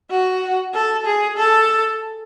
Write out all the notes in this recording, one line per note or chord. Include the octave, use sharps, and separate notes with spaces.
F#4
A4
G#4
A4